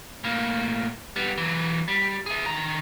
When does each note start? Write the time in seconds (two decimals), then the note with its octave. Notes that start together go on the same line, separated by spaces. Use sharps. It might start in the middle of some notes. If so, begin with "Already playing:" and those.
0.24 A2 A#3
1.16 G3 B3
1.37 E3 F#3
1.88 G3
2.26 G#4 E5
2.46 D#3 A#5